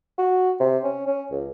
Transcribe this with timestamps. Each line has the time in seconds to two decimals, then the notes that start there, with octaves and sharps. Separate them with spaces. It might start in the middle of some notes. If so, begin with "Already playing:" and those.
0.18 F#4
0.60 C3
0.83 C#4
1.07 C#4
1.31 C#2